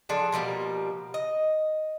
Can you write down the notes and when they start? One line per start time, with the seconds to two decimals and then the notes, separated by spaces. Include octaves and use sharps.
0.09 F3 D4 G#4 A4
0.32 B2 F3 G3 A#3
1.14 D#5